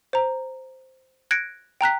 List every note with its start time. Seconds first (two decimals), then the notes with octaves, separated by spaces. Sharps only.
0.13 C5 A#5
1.31 F#6 G#6 A#6 C#7 D7
1.81 G5 A#5 F#6 B6